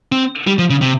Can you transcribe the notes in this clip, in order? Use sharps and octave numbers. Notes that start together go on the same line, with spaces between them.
C4
G3
F3
C#3
C3